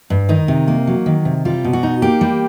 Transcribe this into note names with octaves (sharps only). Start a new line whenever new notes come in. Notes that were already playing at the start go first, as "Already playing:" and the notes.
G2
D#3 D#4
C3
A#3
F#3
D#3
C3
G3 F4
B2
F#4
D#4
A#3 G4
G3